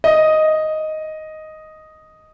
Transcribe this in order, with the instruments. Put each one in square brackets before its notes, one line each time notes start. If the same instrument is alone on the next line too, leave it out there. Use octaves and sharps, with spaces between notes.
[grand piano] D#5